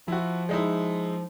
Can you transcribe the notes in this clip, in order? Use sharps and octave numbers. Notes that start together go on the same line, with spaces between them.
F3 E4 F#4
G#3 D#4 E4